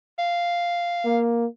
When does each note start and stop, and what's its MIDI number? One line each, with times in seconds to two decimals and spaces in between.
0.19 1.19 77
1.05 1.46 58